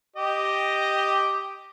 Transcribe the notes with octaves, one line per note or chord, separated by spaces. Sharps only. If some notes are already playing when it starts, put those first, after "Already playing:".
G4 D#5